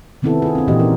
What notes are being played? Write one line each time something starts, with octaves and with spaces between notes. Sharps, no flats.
C3 D#3 B3 C4 E4 A4
F4 G#4
C4 D4
A#2 E3 F#4 G4 C5 D#5
C#4 D#4 A#4